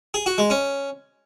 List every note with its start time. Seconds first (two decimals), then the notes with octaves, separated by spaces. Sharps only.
0.14 G#4
0.26 F#4
0.38 G#3
0.50 C#4